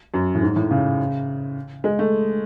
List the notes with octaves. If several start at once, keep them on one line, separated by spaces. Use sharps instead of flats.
F#2
A2
G#2
A2
C#3
G#3
A3